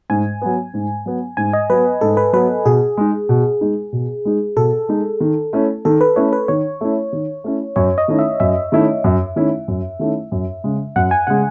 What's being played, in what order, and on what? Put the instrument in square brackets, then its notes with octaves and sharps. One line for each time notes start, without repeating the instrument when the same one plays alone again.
[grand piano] G#2 [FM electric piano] G#5
[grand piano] F#3 B3
G#2
F#3 B3
[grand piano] G#2 [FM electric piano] G#5
[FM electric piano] D#5
[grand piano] F#3 B3 [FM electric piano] B4
[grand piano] G#2 [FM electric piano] A4
[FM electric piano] B4
[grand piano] F#3 B3 [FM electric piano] B4
[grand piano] B2 [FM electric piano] G#4
[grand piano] G#3 D#4
B2
G#3 D#4
B2
G#3 D#4
[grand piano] B2 [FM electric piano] A4
[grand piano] G#3 D#4
D#3
A3 C#4 E4
[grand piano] D#3 [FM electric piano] A4
[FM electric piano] B4
[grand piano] A3 C#4 E4 [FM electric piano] C#5
[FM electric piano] B4
[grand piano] D#3 [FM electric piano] C#5
[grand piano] A3 C#4 E4
D#3
A3 C#4 E4
[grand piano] F#2 [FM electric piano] C#5
[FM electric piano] D#5
[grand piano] D#3 A3 C#4 E4
[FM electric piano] E5
[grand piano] F#2 [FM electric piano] E5
[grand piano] D#3 A3 C#4 E4
F#2
D#3 A3 C#4 E4
F#2
D#3 A3 C#4 E4
F#2
C#3 G#3
[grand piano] F#2 [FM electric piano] F#5
[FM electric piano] G#5
[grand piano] C#3 G#3 [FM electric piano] F#5